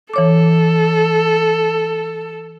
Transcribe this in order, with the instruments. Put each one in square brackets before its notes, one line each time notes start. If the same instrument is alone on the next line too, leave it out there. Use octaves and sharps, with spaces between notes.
[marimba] E3 C#5 D6 [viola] A4